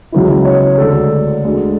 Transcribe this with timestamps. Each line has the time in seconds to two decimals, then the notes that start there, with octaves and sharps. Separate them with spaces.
0.12 C#2 C#3 F#3 B3 E4
0.45 C#5
0.78 D2 D3 G#3 D4 A4
1.44 D2 D3 G#3